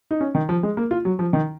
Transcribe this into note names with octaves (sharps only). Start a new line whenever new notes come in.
D#4
C#4
D#3
F3
G#3
A#3
F4
F#3
F3
D#3